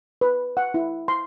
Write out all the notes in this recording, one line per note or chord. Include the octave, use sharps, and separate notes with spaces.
B4
F#5
E4
C6